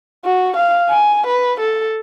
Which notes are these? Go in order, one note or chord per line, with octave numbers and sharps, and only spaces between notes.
F#4
F5
G#5
B4
A4